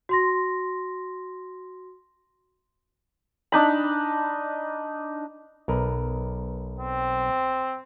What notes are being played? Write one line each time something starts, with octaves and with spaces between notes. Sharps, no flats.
F#4 C6 A#6
D4 D#4 B5
B1 A#4 B4
C4